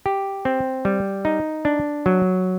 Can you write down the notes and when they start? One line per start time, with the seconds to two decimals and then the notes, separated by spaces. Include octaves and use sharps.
0.06 G4
0.45 C4
0.85 G3
1.25 D#4
1.65 D4
2.06 F#3